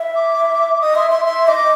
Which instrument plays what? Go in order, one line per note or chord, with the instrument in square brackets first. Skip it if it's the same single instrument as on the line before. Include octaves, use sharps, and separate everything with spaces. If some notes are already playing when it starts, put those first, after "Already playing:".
Already playing: [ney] E5
[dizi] D6
[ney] D#5 [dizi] D#6
[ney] E5 [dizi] C6
[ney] E5 [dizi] C6
[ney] E5 [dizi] C6
[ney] D#5 [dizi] D6